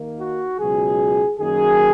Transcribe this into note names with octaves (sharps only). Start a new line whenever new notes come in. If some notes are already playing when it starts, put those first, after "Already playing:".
Already playing: D#2 D#3 A#3
F#4
C#2 B2 F#3 G#4
F#2 D#3 F#3 A#3 G#4